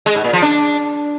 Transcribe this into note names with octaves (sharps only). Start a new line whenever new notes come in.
G#3
G#2
A#2
F3
D4